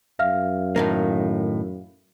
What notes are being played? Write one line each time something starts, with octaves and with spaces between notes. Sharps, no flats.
F#2 E5 F5 F6
A2 D#3 A#3